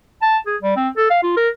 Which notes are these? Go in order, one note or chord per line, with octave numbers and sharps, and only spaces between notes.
A5
G#4
G3
C4
A4
F5
F4
A#4